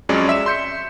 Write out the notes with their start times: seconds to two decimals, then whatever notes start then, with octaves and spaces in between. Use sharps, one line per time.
0.09 F2 F#3 G#3 C#4 C#5 D5
0.29 E5 B6 E7
0.46 C6 G6 C#7